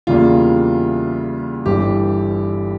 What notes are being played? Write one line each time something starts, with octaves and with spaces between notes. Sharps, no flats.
E2 C#3 G3 A#3 F4
G1 G2 E3 G3 G4